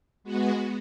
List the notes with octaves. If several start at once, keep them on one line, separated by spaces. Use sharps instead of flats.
G#3 B3 F#4